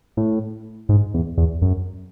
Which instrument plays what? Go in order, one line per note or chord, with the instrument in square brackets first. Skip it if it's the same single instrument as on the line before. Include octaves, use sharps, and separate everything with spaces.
[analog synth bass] A2
G#2
E2
E2
F#2